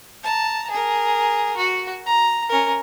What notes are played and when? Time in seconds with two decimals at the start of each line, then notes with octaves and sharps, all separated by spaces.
0.23 A5 A#5
0.70 G#4 A#4
1.57 F#4
2.06 A#5
2.49 C#4 A#4